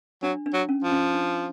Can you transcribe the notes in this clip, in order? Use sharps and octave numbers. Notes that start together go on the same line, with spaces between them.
F#3 D4
D4
F#3
C#4
F3
C#4
D4